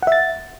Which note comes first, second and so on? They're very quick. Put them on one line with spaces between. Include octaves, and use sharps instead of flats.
F#5 E5 A6